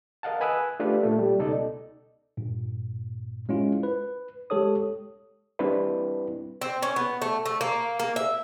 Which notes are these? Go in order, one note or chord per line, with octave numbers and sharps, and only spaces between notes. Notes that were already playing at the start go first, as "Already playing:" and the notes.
A#4 D#5 F5 F#5 A5
B4 G#5 B5 D#6 E6 F#6
A3 D4 F4 G4 B4
A#2 A3
G3
C#2 B2 D#4 A4 D5 D#5
G2 A#2
G#3 C#4 E4 F4
B4
G#3 G4 A4 C#5 D#6
G3 C4 D4 E4 B4
C4
C#4
B3
A3
A3
A#3
A#3
E5